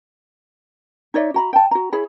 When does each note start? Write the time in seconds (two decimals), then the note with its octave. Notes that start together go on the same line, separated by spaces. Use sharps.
1.14 D#4 C#5 D5 E5
1.34 F#4 A#5 B5
1.53 G5 A5
1.71 F#4 A#5
1.93 E4 G#4 C#5 B5